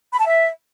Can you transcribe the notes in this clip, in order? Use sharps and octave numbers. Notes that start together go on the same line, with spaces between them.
B5
A5
E5